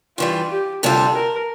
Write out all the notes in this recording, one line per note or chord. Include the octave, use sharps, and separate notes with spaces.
G2 E3 G3 F4
G4
D2 C3 G3 D4 F4 A4
A#4